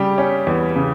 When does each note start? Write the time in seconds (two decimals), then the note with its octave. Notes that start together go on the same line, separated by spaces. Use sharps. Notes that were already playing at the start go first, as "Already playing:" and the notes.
Already playing: C#3 G3 G4
0.18 C#4
0.47 E2
0.76 C#3